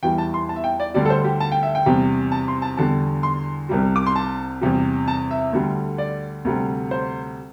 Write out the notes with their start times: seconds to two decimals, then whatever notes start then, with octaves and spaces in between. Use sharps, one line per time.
0.03 E2 E3 G3 G5
0.18 A5
0.34 C6
0.49 A5
0.56 E5
0.64 G5
0.80 D5
0.94 D2 D3 G3 D5
1.05 A4
1.10 C5
1.24 G4
1.40 A5
1.52 G5
1.63 E5
1.75 G5
1.86 E2 C3 G3
2.32 A5
2.48 C6
2.62 A5
2.77 E2 D3 G3 A5
3.23 C6
3.69 C2 C3 G3
3.96 D6
4.06 C6
4.16 A5
4.61 E2 C3 G3
5.08 A5
5.31 E5
5.53 D2 D3 G3
5.98 D5
6.45 D2 C3 G3
6.91 C5